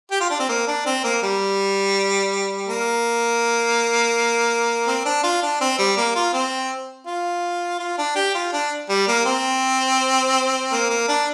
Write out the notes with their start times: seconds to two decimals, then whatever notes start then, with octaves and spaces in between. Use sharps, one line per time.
0.11 G4
0.21 F4
0.30 D4
0.40 C4
0.49 A#3
0.67 D4
0.86 C4
1.04 A#3
1.23 G3
2.68 A#3
4.87 C4
5.06 D4
5.23 F4
5.42 D4
5.61 C4
5.79 G3
5.97 A#3
6.15 F4
6.33 C4
7.06 F4
7.79 F4
7.98 D4
8.16 G4
8.35 F4
8.53 D4
8.89 G3
9.08 A#3
9.25 C4
10.72 A#3
10.90 A#3
11.08 D4